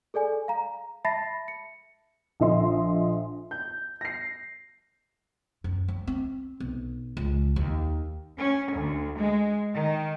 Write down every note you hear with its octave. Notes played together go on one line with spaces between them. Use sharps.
G#4 A4 D5 G#5
F5 A#5
E5 A5 B5 A6 A#6 C7
C#7
A#1 D3 D#5 E5 C6
G6
A#6 C7
F#2
F#3
C4
B1
C#2
D#2
C#4
D2
G#3
D#3